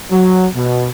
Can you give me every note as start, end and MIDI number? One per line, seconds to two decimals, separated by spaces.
0.11 0.46 54
0.54 0.87 47